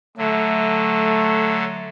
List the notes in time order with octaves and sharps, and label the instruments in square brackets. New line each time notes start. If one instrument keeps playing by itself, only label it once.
[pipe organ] D3 F#3 [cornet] A3